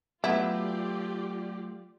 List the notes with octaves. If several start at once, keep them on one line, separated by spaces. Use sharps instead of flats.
F#3 A3 B3 E4 F4 G4 D5